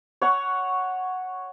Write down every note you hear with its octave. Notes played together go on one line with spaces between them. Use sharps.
C#5 F#5 C#6